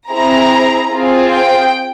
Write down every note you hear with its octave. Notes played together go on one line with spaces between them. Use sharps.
C4 E4 G#4 A#5
C4 F4 G#4
G5